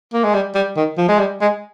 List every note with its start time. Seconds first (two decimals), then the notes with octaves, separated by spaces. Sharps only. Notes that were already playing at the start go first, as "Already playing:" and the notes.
0.13 A#3
0.24 G#3
0.34 G3
0.55 G3
0.77 D#3
0.98 F3
1.08 G#3
1.19 G3
1.41 G#3